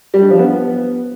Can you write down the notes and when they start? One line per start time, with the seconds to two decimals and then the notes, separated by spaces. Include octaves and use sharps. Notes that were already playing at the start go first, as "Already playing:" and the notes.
0.14 G3
0.22 D4
0.31 F3
0.39 B3